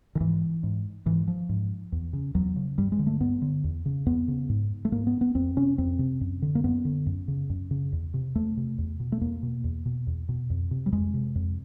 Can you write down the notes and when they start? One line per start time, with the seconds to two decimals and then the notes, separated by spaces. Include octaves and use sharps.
0.15 D#3
0.21 G#2 E3
0.63 G#2
1.06 G#2 E3
1.28 F3
1.49 G#2
1.92 E2
2.13 C#3
2.35 E2 F#3
2.56 C#3
2.78 G2 G3
2.92 G#3
2.99 D3
3.07 A3
3.20 G2 B3
3.42 D3
3.64 E2
3.86 C#3
4.06 E2 B3
4.28 C#3
4.49 G#2
4.85 A3
4.92 G#2 A#3
5.07 B3
5.21 B3
5.35 F2 C4
5.56 C3 C#4
5.78 F2 C4
5.99 C3
6.21 F#2
6.42 D3
6.55 A#3
6.64 F#2 B3
6.85 D3
7.06 F#2
7.28 C#3
7.50 F#2
7.71 C#3
7.92 E2
8.14 C3
8.35 E2 A3
8.57 C3
8.78 E2
9.00 B2
9.12 A3
9.21 E2 A#3
9.43 B2
9.64 E2
9.86 B2
10.07 E2
10.29 B2
10.50 F2
10.71 C3
10.86 G3
10.92 F2 G#3
11.14 C3
11.35 F2